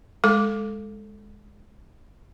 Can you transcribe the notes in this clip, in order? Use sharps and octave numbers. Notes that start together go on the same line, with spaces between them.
G#3 A4 D6